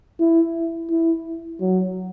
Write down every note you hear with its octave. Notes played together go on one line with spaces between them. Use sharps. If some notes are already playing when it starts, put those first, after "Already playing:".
E4
E4
F#3